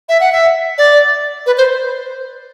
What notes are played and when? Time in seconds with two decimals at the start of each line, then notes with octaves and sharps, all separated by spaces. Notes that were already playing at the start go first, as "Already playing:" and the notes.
0.09 E5
0.20 F#5
0.32 E5
0.78 D5
1.46 B4
1.58 C5